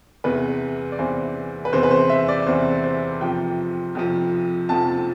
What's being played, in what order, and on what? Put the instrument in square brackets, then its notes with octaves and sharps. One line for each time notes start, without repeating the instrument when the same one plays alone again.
[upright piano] E2 C3 E3 B4
D5
E2 C3 E3 C5
B4
E2 C3 E3 C5
B4
C5
E5
D5
E2 C3 E3 C5
C5
F2 C3 F3 G5
F2 C3 F3
F2 C3 F3 A5
A5